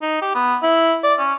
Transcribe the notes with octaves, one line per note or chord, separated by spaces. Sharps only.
D#4
G4
B3
E4
D5
C#4